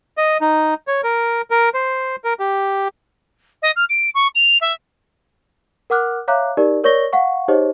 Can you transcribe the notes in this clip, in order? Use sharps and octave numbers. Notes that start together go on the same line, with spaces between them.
D#5
D#4
C#5
A#4
A#4
C5
A#4
G4
D#5
F6
D7
C#6
F7
E5
A#4 F#5 D6 F6 F#6
C#5 E5 F5 A#5 D6 F#6
D#4 G4 A#4 D5
A#4 C#5 D5 C#6 A#6 G7
F5 F#5 C#6
D#4 G4 G#4 C5 C#5 D#5